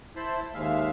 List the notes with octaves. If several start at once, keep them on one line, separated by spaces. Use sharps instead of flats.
E4 C5 A5 B5 C6
D#2 G#3 E5 F5